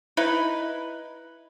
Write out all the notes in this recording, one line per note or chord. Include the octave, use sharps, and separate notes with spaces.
D#4 E4 B4